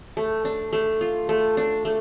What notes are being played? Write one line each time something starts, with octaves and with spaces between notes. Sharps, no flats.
A3
D4
A3
F4
A3
D4
A3